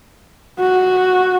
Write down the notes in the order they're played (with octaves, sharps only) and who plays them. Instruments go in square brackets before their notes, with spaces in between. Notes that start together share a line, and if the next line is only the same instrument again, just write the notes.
[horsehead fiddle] F#4